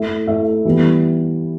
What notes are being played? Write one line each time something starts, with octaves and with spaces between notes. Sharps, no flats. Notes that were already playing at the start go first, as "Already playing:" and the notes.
Already playing: A3 E4 A4 E5
A3 E4 A4 E5
E3 G3 B3